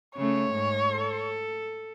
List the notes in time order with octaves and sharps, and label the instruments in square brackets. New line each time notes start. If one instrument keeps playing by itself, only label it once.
[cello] C#3 A3 [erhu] C#5
[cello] G#2
A4